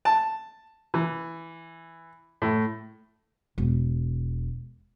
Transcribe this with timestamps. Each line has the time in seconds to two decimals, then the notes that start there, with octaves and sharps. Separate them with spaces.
0.05 A5
0.94 E3
2.42 A2
3.58 E1